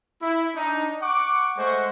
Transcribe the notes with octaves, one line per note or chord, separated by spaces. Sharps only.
E4
D4 D#4
F#5 C#6 D6
G#3 A3 C5 F#5 C#6